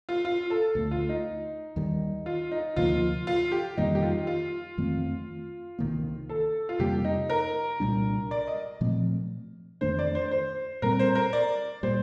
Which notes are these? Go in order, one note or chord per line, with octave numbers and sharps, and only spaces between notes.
F4
F4
A4
D2 D3 A3
F4
D#4
D#2 D#3 G3
F4
D#4
D2 C3 F3 A#3 F4
F4
G4
F2 D#3 G3 A#3 D#4
G4
F4
F4
F2 D#3 A3 C4
C2 C3 D#3 A#3
A4
F4
F2 C3 G3 A#3 G4
D#4
A#4
C2 A#2 G3 D4
D5
D#5
A#2 F3 A3 C4
F2 D#3 A3 D4 C5
D5
C5
C5
A#2 G3 C4 A#4
C5
A#4
D5
A#2 G3 C5